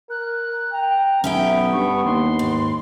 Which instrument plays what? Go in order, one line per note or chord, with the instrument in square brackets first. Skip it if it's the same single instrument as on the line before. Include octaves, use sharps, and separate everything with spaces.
[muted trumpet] A#4 [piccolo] F#6
[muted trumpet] G5 [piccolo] A#5
[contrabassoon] B1 [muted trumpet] B3 [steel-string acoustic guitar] C#4 E5 G5
[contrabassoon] G2 [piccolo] C#6
[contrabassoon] D#2 [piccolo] C6
[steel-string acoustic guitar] G#2